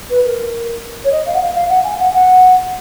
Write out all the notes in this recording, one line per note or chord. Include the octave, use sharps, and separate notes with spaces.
B4
A#4
C#5
D#5
F5
F#5
F5
F5
F#5
G#5
F#5
F#5